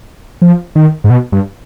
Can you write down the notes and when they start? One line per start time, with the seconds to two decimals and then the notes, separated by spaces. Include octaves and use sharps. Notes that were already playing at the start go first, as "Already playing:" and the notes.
0.42 F3
0.75 D#3
1.04 G#2
1.10 B2
1.32 G2